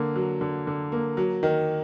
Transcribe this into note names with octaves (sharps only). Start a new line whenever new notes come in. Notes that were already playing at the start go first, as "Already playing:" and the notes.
Already playing: D3 A#3
F#3
D3
D3
A#3
F#3
D#3